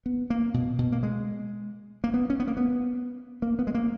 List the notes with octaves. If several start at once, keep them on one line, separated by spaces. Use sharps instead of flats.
B3
A#3
B2
B2
A#3
G#3
A#3
B3
C#4
B3
A#3
B3
A#3
B3
G#3
A#3